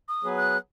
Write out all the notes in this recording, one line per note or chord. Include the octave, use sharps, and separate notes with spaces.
D#6
F#3 B3 G#4 B4
F#6